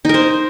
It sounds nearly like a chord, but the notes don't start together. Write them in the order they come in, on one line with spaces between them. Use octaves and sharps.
D#4 A#4 C5